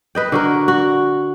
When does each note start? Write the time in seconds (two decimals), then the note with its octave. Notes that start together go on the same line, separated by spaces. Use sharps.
0.15 B4 D#5 G5
0.32 D3 F#4 A#4
0.68 F#4